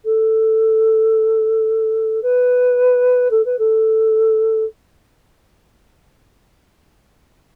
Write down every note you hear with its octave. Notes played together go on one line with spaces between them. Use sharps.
A4
B4
A4
B4
A4